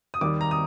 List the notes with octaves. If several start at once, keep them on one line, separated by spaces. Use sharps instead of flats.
D#6
D#2 D#3 G3 D6
A#5
D#6